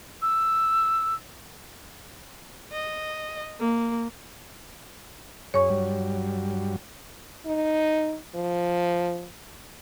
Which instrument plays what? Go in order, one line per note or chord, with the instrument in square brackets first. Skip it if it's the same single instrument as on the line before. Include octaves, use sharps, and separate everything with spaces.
[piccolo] E6
[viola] D#5
A#3
[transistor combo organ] F#2 G#4 [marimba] C#5 C#6
[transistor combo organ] G2 F#3 G3
[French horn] D#4
F3